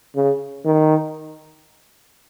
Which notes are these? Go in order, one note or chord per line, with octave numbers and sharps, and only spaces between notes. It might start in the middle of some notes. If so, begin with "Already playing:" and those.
C#3
D#3